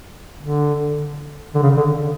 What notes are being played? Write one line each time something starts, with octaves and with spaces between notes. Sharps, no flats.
D3
D3
C#3
D3